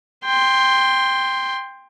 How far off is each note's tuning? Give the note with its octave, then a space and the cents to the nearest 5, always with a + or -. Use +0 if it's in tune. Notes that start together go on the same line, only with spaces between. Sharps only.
G5 +15 C6 +0